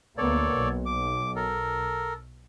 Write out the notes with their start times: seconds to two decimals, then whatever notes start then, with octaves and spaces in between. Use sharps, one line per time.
0.18 D2 A#3 B3 A4 C#5 D5
0.56 B1
0.86 D6
1.36 A4 A#4